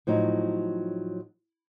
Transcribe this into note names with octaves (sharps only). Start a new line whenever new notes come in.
A2 F3 F#3 D#4